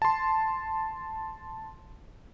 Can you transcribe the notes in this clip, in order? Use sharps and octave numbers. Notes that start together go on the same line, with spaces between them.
A5 C6